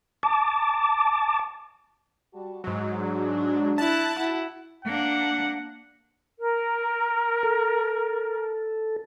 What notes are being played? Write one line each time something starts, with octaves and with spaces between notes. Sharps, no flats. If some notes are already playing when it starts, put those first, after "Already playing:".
A5 D6
G3 F#4 A5
G#2 F#3 D#5
D4
E4 A5 F#6
E4 F#4 F#5
A#3 D4 F#5
A#4
A4